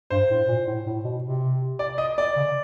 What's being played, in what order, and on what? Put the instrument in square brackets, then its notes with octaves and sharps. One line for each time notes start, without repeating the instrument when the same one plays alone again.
[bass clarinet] G2 [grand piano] C5
[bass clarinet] A2
A#2
A2
A2
B2
C3
[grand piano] D5
D#5
D5
[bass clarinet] C#3